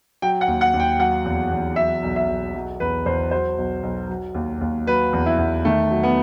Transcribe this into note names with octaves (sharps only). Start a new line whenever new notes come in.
F#3 G5
F#5
D#2
F#5
D#2
G5
F#3 F#5
E2
E2
F#3 E5
B1
E5
B1
F#3
E2 B4
E2 C5
F#3 C5
B1
B1
F#3
D#2
D#2
F#3 B4
E2
E4
E2
D#3 A3
F#3
B3